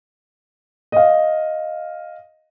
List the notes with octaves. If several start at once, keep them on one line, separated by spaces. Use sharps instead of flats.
D#5 F5